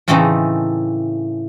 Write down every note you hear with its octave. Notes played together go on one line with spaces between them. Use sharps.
A2 C#3 E3 A3 C4 D#4